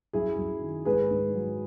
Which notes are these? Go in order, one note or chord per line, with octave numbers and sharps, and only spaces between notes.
F#2 E4 G#4
F#2
D#3
G#2 G#4 B4
G#2
F#3